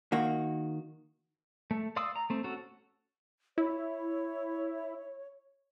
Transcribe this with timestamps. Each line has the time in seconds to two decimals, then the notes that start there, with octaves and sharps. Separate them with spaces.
0.12 D#3 A#3 F#4
1.71 A3
1.96 D5 F5 C6 D#6 E6
2.16 A#5
2.30 A3 C4
2.44 C#4 F#4 A4
3.58 E4 C#5